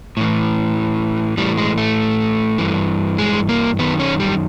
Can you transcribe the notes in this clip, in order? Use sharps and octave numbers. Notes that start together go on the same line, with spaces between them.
A2 E3
A2 E3 G3
G#3
A3
G2 E3
G#3
A#3
F#2 D#3 B3
C#4
G3